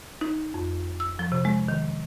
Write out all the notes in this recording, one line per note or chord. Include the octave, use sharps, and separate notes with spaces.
D#4
F2
E6
F3
C3
G#3
D#3